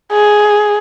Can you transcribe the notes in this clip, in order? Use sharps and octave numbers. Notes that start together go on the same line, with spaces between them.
G#4